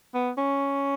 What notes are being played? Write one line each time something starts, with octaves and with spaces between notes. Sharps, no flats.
B3
C#4